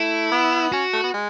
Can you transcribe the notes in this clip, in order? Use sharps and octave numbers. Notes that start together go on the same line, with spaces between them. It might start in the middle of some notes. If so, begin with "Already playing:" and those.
Already playing: A3 E4
B3
C#4 F#4
A3
B3
G#3